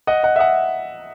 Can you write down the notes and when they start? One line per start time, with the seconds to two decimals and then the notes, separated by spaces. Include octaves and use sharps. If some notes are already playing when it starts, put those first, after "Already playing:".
0.07 D#5 F#5
0.23 D#5 F#5
0.36 E5
0.39 D#5 F#5